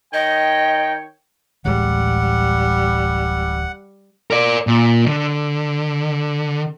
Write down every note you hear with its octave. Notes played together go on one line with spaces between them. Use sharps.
D#3 C#5 D#5 G5
D1 A1 G3 G#3 F#5
A#4 D5
A#2
D3